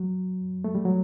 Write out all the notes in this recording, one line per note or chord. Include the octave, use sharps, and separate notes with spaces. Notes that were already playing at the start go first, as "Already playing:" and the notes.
Already playing: F#3
A3
G3
F#3